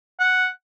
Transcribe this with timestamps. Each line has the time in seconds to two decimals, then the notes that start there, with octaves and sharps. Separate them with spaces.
0.20 F#5